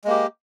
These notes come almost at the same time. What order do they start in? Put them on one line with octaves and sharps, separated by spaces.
G#3 A#3 G4